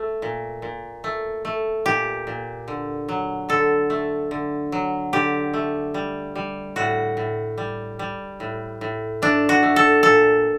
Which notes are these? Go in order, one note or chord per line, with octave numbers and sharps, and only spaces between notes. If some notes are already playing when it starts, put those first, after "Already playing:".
Already playing: A3
A#2
A#2
A3
A3
A#2 G4
A#2
D3
F#3
D3 A4
A3
D3
F#3
D3 G4
A3
G3
G3
A2 F#4
A2
G3
G3
A2
A2
A3 D4
F#4
A3
A4
A#2 A4